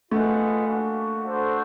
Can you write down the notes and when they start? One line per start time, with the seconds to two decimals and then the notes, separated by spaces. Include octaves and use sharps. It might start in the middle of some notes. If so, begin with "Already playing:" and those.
0.11 A3 F4 G#4 B4 D#5 F#5
0.67 A#3 D4 F#4
1.22 D4 F#4 A4 C5